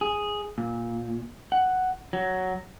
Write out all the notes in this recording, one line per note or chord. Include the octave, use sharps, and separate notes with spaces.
G#4
A#2
F#5
F#3